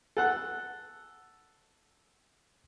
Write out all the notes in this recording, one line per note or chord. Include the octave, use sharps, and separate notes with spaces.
A4 F#5 F#6